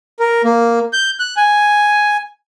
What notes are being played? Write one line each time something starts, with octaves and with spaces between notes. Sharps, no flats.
A#4
A#3
G6
F#6
G#5